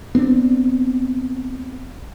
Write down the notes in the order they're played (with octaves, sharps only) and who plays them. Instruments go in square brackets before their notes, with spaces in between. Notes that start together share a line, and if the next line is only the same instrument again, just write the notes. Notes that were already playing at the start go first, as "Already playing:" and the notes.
[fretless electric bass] B3 C4 D4